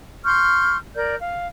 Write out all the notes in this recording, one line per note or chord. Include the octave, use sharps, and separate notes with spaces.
C6 C#6 F6 G6
A#4 D5 G6
F5